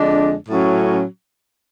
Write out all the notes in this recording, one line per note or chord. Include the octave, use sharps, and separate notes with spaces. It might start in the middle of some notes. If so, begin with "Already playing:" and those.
Already playing: F2 D3 G#3 D4
A2 F#3 C#4